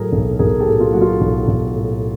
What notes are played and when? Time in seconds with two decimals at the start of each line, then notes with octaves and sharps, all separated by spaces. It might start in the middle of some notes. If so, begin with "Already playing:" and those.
Already playing: A2 F#3 G#4 A#4
0.12 B1
0.39 B1 G#4 A#4
0.60 G4 A4
0.67 A2
0.80 F4
0.93 F#3 F#4
1.01 F4
1.21 B1
1.48 B1
1.76 A2